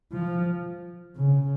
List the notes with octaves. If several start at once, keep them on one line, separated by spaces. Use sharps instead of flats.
F3
C#3